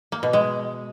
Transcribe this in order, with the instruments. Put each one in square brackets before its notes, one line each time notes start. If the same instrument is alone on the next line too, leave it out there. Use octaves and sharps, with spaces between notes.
[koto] A#3
B2
G#3